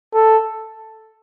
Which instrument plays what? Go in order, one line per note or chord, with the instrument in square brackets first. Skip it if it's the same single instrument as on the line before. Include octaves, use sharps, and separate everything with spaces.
[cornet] A4